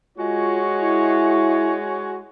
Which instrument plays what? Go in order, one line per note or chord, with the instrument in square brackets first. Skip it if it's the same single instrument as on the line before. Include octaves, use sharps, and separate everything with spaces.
[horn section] G#3 F#4 C#5 [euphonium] F4
[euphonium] E4